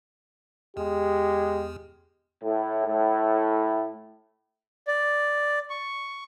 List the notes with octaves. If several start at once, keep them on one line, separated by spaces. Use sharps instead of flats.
E2 G#3 G4
A2
A2
D5
C#6